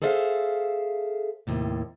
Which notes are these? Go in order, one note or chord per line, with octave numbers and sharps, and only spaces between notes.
G#4 A4 C5 D5 E5 F5
D#2 A2 C3